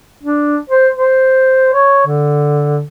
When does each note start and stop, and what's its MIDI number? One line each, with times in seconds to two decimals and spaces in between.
0.23 0.58 62
0.70 0.88 72
0.95 1.69 72
1.74 2.02 73
2.07 2.81 50